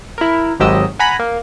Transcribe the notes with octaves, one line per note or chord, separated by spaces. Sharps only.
E4 A#4
G#1 G#2 F#3 G4 D#5 E6
F#5 G#5 A#5 B5
A#3